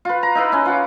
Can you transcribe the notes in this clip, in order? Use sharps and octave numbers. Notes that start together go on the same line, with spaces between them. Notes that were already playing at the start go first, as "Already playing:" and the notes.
F4 B4
A#5
D#4 E4 B4
C#4 E4
F4 F#5 D6